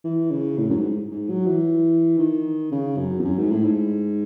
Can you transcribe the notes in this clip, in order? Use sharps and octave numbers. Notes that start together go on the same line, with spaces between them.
E3
C#3
A2
F#2
G#2
G#2
F#3
E3
D#3
C#3
F#2
E2
F#2
G#2
A2
G#2